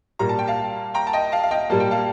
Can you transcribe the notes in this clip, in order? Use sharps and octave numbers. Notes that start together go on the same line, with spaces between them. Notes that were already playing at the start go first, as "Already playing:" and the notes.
A#2 G3 A#3 A#5
A5
G5
F5 A5
G5 A#5
A5
D#5 G5
F5 A5
F5
D#5 G5
A#2 G3 A#3 A5
G5
F5 A5